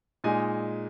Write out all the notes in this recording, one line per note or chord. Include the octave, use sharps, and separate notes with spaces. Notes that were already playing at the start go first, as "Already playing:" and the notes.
A#2 G#3 D#4 G#5